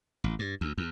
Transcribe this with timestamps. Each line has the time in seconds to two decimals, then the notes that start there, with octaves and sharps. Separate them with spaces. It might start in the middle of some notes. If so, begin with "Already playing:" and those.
0.24 A1
0.39 G2
0.61 D2
0.78 E2